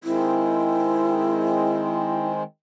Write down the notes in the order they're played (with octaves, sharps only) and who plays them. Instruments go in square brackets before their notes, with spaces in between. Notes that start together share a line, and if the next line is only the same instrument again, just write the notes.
[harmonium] D#3 G#3 C4 [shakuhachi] E4